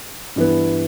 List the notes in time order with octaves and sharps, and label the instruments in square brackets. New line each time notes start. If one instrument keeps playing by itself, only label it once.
[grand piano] G2 E3 B3